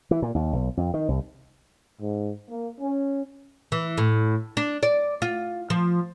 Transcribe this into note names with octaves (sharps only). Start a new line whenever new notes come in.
E3
A#2
D#2
B1
F2
D#3
C2
G#2
A#3
C#4
E3
A2
D4
D5
F4
F3